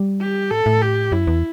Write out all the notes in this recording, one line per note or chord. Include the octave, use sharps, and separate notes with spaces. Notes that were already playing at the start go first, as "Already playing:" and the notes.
Already playing: G3
G4
A2 A4
A2
G4
F#2 E4
E2